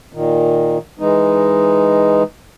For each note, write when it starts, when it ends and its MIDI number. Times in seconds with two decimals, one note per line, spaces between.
0.13 0.78 46
0.13 0.78 51
0.99 2.23 52
0.99 2.23 56
0.99 2.23 63